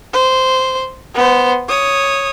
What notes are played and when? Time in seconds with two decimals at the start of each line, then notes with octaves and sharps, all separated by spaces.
0.13 C5
1.15 B3 C5
1.68 C#5 D#6